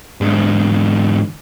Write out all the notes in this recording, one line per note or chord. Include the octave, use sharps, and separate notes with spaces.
G#2 D3